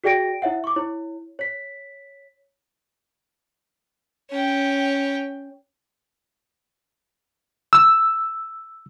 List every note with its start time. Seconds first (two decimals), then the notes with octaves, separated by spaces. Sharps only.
0.04 F#4 G#4 D5 G5 A#6 D7
0.42 E4 C#5 E5 F#5
0.64 C#6 D6
0.76 E4 C#5
1.39 C#5 B6
4.31 C#4 G5
7.73 E6